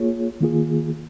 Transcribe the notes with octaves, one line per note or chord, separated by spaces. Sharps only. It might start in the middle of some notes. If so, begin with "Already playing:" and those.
Already playing: A#3 F4 G#4 C#5
D#3 A#3 F4 G#4